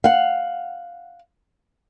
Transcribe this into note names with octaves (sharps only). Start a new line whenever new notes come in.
F5 F#5